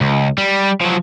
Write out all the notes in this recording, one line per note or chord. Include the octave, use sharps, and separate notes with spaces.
C#2
G3
F3 F#3